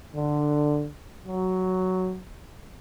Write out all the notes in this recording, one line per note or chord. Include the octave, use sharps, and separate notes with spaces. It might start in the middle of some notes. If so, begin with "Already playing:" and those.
D3
F#3